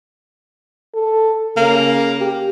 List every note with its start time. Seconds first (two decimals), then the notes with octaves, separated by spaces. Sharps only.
0.94 A4
1.57 C#3 A#3
2.21 G4